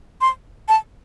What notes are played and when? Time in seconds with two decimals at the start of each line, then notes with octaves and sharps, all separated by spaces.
0.21 C6
0.68 A5